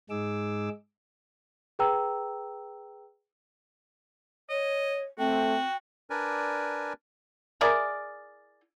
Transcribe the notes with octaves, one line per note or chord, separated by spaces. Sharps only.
G#2 G#3 D#4 G#4 D6 E6
G#4 B4 G5 A#5 E6
C#5 D#5
A3 C4 F#4 G5
D4 A#4 B4 D5 G#5
E4 G#4 A#4 D5